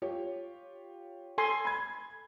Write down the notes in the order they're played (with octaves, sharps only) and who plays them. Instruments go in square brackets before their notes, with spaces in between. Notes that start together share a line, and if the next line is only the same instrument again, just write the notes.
[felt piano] F4 G4 C#5
[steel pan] A4 G#5 C6
[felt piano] B5 G#6